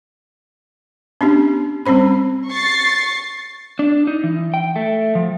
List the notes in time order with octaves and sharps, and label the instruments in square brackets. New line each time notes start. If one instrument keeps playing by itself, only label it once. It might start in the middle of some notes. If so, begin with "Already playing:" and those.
[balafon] B3 C#4 D4 G4
G3 C4 C#4 C5 B5
[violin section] C#6 A6 C7
[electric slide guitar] D4
D#4
E3
G5
A3
F3